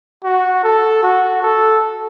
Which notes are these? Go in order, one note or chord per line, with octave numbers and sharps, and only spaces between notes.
F#4
A4
F#4
A4